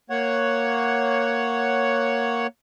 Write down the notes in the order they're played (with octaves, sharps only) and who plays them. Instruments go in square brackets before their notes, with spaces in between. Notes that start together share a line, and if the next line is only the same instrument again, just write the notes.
[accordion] A#3 C#5 F#5